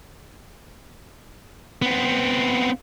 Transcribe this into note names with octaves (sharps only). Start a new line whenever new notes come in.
B3 C4